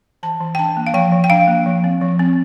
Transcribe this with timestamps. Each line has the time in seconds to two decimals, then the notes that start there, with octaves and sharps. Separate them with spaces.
0.23 E3 A5
0.40 E3
0.55 G5
0.59 D4 A5
0.77 A#3
0.87 F5
0.94 F3 G5
1.12 F3
1.24 G5
1.30 D4 F5
1.47 A#3
1.66 F3
1.84 C4
2.01 F3
2.19 C4